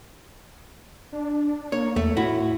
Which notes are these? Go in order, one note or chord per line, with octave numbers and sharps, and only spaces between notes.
D4
A#3 C#5
E2 A3
A2 E4 F#4